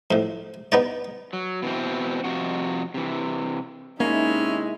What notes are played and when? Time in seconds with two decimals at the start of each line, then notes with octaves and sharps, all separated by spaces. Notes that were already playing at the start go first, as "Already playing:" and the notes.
0.11 F2 A2
0.72 B3 D#4 D5
1.33 F#3
1.62 B2 E3 C4
2.24 F2 C3 F#4
2.94 C3 E3
4.00 C3 G#3 A#3 C#4 D#4 E4 E5